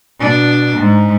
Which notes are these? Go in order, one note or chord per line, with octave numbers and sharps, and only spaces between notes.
B2 D4
G#2